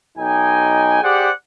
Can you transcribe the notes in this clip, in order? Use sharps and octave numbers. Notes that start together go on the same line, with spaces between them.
B1 D#4 G5 G#5
G4 G#4 C5 D5 F#5